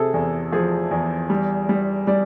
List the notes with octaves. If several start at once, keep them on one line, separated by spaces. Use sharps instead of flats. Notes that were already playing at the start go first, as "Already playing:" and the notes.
Already playing: C3 G#4 A4
E2
F3 G#4
E2
G3
G3
G3 D5